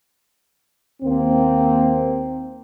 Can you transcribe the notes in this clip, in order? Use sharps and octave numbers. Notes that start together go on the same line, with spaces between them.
D#2 A#3 C4